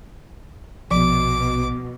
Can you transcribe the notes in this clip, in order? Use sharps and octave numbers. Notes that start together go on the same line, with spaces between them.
A#1 B2 F3 D6